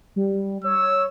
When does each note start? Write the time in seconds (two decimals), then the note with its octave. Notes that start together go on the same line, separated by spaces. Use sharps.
0.16 G3
0.64 C#5 E6